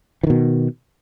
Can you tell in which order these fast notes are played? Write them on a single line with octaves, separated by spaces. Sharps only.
E3 D#3 B2